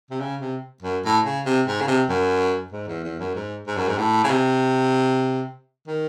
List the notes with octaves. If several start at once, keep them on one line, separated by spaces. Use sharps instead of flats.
C3
C#3
C3
F#2
A2
C#3
C3
G#2
C#3
C3
F#2
G#2
E2
E2
F#2
G#2
G#2
F#2
G#2
A2
C#3
C3
D#3